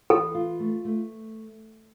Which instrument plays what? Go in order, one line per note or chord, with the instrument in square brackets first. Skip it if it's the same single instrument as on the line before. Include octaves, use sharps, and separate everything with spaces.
[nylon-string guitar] E3 [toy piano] A4
[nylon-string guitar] F4
A3
A3